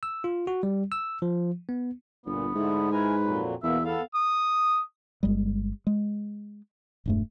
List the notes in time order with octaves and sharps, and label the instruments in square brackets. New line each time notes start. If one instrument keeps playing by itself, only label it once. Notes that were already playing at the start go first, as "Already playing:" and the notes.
[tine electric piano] E6
F4
F#4
G3
E6
F3
B3
[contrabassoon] G1 [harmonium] A#2 [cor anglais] B3
[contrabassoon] G#2 [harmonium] D3 A3 E4
[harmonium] E4 A#4 G#5 [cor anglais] B4
[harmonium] F2 A#2 F#3
[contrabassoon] E2 [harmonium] B2 A#3 [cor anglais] E5
[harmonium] B3 A4 [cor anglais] F5
[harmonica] D#6
[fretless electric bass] G1 G3 G#3
G#3
E1 G2 A3